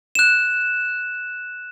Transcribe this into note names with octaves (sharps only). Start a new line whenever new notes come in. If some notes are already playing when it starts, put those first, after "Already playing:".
F#6 E7